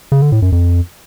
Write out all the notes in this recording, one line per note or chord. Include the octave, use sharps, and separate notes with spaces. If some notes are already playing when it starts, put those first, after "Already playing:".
C#3
D3
A2
F#2
F2